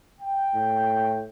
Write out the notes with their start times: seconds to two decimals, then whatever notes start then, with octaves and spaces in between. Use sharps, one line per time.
0.20 G5
0.54 A2